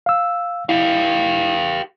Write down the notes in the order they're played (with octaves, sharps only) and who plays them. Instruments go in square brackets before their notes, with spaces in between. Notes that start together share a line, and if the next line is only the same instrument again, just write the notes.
[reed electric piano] F5 E6
[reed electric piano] E4 [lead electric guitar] G4 F5